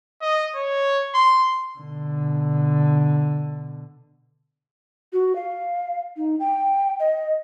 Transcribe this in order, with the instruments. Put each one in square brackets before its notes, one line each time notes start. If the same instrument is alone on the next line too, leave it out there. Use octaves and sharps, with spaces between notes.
[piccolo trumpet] D#5
C#5
C6
[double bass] B2 D3
[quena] F#4
F5
D#4
G5
D#5